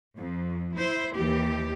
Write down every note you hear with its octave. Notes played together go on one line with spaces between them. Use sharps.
F2
E4 C5
D#2 E3 G4